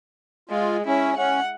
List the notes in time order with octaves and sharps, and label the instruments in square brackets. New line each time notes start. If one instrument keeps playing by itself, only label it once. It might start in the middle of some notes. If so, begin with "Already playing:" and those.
[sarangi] G#3 [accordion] F4
[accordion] C#4 [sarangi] E4
[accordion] C#4 [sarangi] F#5